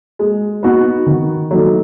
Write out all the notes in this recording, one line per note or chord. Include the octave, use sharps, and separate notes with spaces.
G#3
B3 D#4 F#4
D#3
F#3 A3 D#4